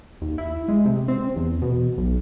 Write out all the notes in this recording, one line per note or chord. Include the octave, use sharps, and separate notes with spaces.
D#2
E4
G#3
C3
C4
E2
B2
B1